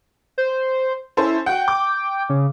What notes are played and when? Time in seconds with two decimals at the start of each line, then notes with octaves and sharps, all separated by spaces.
0.38 C5
1.17 C#4 E4 A4 C5
1.46 F#4 F#5 G5
1.68 D6
2.29 C#3